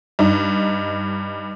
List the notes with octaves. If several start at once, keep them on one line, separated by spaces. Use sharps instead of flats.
G2 D#4